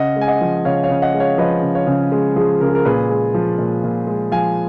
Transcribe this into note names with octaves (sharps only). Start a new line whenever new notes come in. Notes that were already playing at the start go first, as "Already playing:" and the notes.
Already playing: C#3 D#5 F#5
G#3
G#5
D#5 F#5
F3
C#3 C#5 F5
C#5 F5
C#3
D#5 F#5
G#3
C#5 F5
F3 B4 D#5
C#3
C#5 F5
C#3
G#3
F3 G#4
C#3 A#4
G#4
A#4
A#2 G#4 B4
G#3
F3
A#2
A#2
G#3
F3 F5 G#5